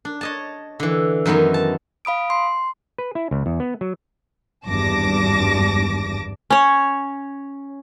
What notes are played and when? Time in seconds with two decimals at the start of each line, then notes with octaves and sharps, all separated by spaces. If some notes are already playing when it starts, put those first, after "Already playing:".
0.05 D4
0.21 C#5 D#5 A5
0.80 D3 E3
1.26 F#2 D#3 E3 B3 D#5
1.54 A5
2.05 F5 B5 D#6 D7
2.30 C6
2.98 B4
3.15 E4
3.31 C#2
3.46 E2
3.60 B3
3.81 F#3
4.67 G#1 E2 G2 A5 D6 A#6
6.50 C#4 C#5